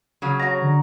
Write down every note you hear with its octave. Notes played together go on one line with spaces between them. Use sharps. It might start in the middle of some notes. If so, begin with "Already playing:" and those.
C#3 F#3
F#4 C#5 A#5
D3